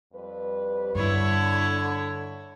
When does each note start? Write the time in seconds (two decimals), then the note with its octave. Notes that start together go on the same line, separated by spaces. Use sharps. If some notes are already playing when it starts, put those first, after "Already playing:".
0.13 F2 G3 B4
0.95 G2 D3 E4 C#5